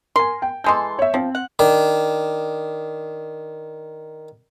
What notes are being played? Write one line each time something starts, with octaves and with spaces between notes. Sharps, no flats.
A#4 G#5 C6
G5
E3 G#3 A4 C6 G6
C#5 E5
F3 C4
F#5
D#3 D4